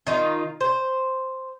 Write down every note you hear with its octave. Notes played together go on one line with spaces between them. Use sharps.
D#3 D#4 F4
C5